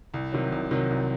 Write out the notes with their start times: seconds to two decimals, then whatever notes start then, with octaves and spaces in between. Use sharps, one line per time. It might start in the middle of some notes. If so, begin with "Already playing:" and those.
0.14 C2
0.32 C3 D#3 F#3
0.52 C2
0.71 C3 D#3 F#3
0.90 C2